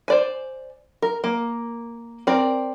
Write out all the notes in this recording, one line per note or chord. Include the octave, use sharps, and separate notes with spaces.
C5 D5 G#5
A#4
A#3
C4 A#4 D5